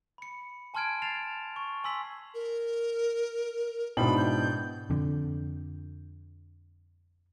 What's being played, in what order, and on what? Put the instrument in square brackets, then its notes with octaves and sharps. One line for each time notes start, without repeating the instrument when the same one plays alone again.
[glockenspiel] B5 C#7
G#5 A5 C6 F6 G#6 D7
G#6 A6 C7 E7 F7
C#6
G#5 C6 E6 B6 F#7
[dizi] A#4
[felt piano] G#2 D4 E4 [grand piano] B2 G5 F#7 [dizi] B5
[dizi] G6
[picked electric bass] F2 D3